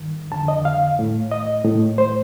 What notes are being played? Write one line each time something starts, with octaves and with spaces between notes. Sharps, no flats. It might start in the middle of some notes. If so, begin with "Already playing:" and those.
Already playing: G2 D#3
F2 D3 A5
D#5
F5
A2
D#5
A2
C5